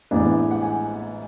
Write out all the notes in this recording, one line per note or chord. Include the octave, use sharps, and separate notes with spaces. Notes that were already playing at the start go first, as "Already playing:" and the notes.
A1 G#2 E3 B3 D4
F#5
G#5